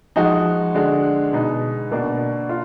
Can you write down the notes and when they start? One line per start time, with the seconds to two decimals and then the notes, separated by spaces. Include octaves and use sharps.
0.16 F3 G#3 D#4 F#4
0.74 D3 G#3 D4 F#4
1.33 B2 G#3 D#4
1.91 B2 A#3 D4 F#4
2.49 F4